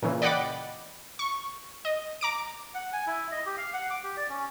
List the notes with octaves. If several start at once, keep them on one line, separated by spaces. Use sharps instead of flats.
A#2 C#3 E3
D5 D#5 F#5 G5 B5 D6
C#6
D#5
A#5 D6 D7
F#5
G#5
E4
D#5
G4
F5
F#5
D6
G4
D5
C#4